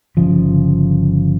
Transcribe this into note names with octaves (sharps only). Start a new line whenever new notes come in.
G1 C#3 F3